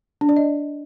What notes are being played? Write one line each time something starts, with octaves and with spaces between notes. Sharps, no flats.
D4
D5
D#5